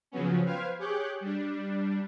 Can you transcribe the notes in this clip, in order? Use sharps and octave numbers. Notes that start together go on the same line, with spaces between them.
C#3 F3 F#3 B3 C#4
B4 C5 F5 G5 F6 G#6
G4 G#4 C#5 D6 F#6 G6
G3 D4